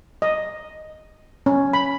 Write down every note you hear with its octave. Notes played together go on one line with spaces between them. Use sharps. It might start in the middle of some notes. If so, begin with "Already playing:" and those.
D#5
C#4
B5